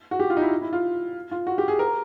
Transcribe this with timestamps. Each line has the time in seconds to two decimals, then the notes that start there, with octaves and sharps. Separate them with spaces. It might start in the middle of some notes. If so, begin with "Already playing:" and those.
0.11 F#4
0.20 G4
0.30 F4
0.37 D#4
0.41 E4
0.62 E4
0.73 F4
1.31 F4
1.47 F#4
1.58 G4
1.68 G#4
1.79 A#4